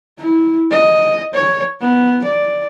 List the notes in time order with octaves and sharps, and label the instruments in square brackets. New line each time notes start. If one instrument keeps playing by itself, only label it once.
[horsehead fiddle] E4
D#5
C#5
B3
D5